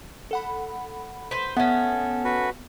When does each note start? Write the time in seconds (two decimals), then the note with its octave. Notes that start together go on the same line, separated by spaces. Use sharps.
0.31 A4 F#5 B5
1.31 B4 C5
1.57 A3 B3 C#4 F#5
2.25 F#4 B4